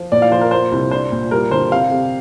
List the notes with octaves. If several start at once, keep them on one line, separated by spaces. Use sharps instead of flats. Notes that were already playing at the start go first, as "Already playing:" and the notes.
Already playing: F3
A#2 D5
F5
F3 C5
A#4
A#3 C5
C2
D4 C5
A#2
G3 A#4
D3 C5
C3 F5
C3